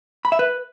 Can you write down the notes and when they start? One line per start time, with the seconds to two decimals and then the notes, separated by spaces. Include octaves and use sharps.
0.25 B5
0.32 E5
0.39 B4